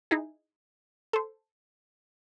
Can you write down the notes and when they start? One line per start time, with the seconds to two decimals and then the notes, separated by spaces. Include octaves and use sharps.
0.11 D#4 E4 G#4
1.13 A4 C5